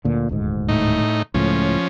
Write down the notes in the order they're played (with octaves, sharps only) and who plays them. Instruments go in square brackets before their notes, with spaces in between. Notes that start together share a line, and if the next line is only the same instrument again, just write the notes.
[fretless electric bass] D2 A#2 D3
D#1 D2 G#2
[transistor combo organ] A2 D#4
[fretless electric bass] C#2 A2 [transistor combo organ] F3 C#4